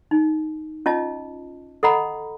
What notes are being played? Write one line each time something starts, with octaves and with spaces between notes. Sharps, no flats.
D#4
C#4 F4 D#5 A5
A4 D#5 F#5 A#5 B5